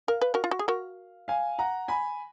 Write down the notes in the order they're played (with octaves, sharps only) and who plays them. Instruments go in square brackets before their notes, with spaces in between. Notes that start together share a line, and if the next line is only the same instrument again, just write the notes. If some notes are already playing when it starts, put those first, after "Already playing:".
[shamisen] A#4 [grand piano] F5
[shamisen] B4
F#4 A#4
F4
F#4
G#4
F#4 A#4
[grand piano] F5 G#5
F#5 A#5
G#5 B5